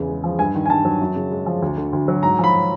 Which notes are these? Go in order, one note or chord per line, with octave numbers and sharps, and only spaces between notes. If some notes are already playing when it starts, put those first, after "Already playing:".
Already playing: E2 C#3
G#3
F3
G2 G#5
D#3
G#5
G2 A5
F#3
F#2
C#3
G#3
F3
D2
D3
D2
F#3
G#2 A#5
F3 B5